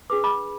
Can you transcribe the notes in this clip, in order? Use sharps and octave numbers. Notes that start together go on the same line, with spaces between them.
D4 G#4 B4 D6
B5 D6